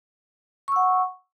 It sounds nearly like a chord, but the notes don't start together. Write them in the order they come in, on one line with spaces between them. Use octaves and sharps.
C#6 E6 F#5